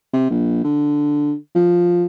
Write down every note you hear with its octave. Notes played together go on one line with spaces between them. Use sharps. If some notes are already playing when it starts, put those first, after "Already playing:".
C3
A#1
D3
F3